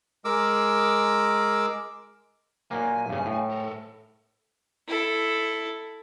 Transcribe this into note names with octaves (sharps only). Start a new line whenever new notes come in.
G#3 A#4 D6 E6
A#2 F#3 A#3 G#5
G2 C#3
A2
A4 A#4
E4 A4